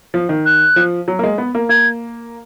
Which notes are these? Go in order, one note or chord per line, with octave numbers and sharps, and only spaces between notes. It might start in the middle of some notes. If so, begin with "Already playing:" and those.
F3
D#3
F#6
F3
F#3
A#3
G#3
B3
A#3
A#3 G#6